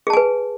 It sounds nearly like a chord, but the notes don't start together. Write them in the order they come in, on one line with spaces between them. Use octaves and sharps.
G#4 A5 G#5 B4